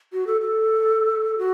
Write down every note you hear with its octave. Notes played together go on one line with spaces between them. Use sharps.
F#4
A4
A4
F#4